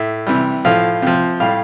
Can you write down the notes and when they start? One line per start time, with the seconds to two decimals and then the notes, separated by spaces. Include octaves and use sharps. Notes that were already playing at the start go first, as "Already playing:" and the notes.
Already playing: A2 E5
0.27 C3 E3 G3
0.65 A2 F3 F5
1.02 C3 F3
1.40 A2 G3 F5